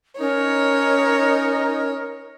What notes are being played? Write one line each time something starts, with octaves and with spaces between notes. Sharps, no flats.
C#4 D#4 A#4 C#5